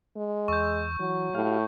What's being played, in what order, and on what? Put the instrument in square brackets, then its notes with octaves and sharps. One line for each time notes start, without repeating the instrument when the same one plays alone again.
[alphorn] G#3
[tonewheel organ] E2 E6 [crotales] C#6 G6
[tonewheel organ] E3 [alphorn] F#3
[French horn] A2 [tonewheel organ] F#4 G4 F5